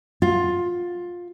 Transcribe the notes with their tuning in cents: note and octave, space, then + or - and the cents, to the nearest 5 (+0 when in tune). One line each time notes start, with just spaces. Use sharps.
F4 +15